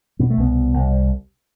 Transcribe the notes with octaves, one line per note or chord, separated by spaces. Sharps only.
B2 B3
A3
C2 B3
B2
C2